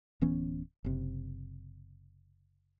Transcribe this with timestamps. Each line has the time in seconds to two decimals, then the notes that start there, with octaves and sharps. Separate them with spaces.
0.21 D1 E3 B3 C#4
0.84 F#1 C3